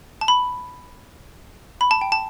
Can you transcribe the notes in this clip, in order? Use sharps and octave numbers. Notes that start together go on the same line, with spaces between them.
A5
B5
B5
A5
G5
A5